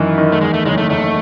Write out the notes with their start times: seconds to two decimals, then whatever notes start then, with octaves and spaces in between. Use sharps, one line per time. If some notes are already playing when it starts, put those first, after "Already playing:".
Already playing: G#1 F#2 D#3 E3
0.18 D#3
0.32 A3
0.41 E2 G#3
0.54 A3
0.65 F#1 G#3
0.78 A3
0.90 F#1 A3